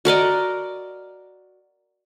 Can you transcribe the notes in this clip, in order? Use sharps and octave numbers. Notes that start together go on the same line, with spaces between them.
F#4 A#4 D5 D#5